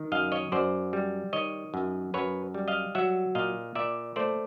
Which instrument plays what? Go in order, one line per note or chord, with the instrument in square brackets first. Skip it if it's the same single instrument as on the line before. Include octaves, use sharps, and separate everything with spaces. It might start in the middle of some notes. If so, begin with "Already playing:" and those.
Already playing: [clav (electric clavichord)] D#3
F#2 D#5 F5
C#5 D#5
F#2 C5 D5
G3
D#3 C#5 D#5
F#2
F#2 B4 C#5
G3
D#5 F5
F#3 E5 F#5
A#2 D#5 F5
A#2 D5 E5
A3 C5 D5